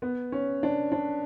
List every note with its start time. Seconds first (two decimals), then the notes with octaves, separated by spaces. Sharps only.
0.02 B3
0.32 C#4
0.63 D4
0.92 D4